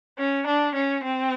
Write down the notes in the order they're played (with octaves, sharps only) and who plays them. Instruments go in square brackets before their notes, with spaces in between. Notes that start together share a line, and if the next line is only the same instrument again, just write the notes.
[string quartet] C#4
D4
C#4
C4